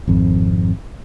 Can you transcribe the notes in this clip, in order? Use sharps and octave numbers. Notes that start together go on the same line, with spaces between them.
G#1 F2